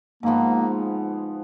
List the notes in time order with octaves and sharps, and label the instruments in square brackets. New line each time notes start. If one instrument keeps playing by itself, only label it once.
[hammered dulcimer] G#2 F3 B3 [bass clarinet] A#3